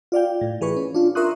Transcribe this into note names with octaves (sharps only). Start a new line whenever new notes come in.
F4 D5 F5 G5
A2
E3 G#4 B4 C#6
C#4
D4 F4
A#4 E5 C6 C#6 D#6 F#6